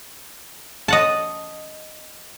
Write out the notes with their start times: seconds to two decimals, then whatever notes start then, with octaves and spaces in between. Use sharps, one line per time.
0.88 D#5 F#5 A5